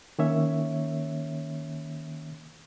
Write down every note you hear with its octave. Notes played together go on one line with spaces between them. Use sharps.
D#3 A#3 C#4 C#5 E5